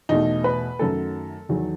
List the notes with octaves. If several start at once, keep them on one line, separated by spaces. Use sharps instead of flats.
E2 B2 A3 D#4
B4
F#2 D#3 F#3 A3 A4
E2 D#3 F#3